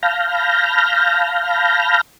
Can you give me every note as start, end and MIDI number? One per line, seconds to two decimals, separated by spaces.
0.03 2.01 77
0.03 2.01 81
0.03 2.01 83
0.03 2.01 89
0.03 2.01 91
0.03 2.01 94